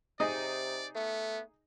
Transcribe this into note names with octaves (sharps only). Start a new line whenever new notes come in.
C3 D#4 G#4 D5 D#5
A3 B3